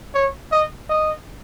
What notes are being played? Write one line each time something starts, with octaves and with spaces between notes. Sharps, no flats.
C#5
D#5
D#5